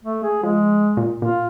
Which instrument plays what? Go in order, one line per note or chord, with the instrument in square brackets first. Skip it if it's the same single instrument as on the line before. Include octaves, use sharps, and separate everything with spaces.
[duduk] A3
G#4
[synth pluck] F3 [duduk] G#3
[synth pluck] A#2
[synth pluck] A#2 [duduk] F4